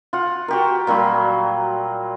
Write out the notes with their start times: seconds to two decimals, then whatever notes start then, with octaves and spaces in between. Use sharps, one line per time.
0.13 F4 F#5
0.48 F#4 G4 A#4
0.87 A#2 F#3 G3 F4